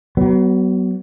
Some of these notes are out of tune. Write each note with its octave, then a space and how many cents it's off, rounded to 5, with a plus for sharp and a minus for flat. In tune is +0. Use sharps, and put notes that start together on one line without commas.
F#3 +35 B3 +0